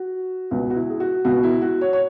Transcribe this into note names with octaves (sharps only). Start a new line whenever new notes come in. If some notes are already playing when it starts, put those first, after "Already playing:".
Already playing: F#4
C#2 B2 F#4
F#4
E4
G#4
F#4
C#2 B2 F#4
E4
F#4
C#5
C#5